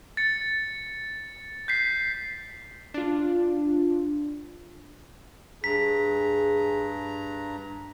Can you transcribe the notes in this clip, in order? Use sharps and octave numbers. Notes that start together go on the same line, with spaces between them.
A6 C#7
G6 B6 C7
D4 F4
G2 G#4 A#5 B6